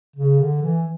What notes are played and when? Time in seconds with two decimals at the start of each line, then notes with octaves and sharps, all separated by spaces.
0.16 C#3
0.39 D3
0.62 E3